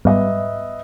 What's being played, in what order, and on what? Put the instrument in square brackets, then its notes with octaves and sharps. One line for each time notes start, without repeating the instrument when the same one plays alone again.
[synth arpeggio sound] G#2 G3 B3 [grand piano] B4 D#5 E5